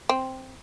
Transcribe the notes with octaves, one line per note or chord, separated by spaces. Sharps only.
C4